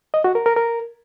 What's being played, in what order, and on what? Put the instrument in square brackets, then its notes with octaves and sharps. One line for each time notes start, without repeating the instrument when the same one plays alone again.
[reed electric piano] D#5
F#4
A#4
A#4
A#4